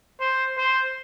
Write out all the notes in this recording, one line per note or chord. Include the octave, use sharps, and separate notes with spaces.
C5
C5